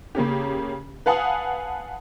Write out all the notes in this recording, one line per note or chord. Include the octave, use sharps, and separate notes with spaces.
C#3 A#3 C#4 G4
B4 F5 F#5 G#5 A5 D#6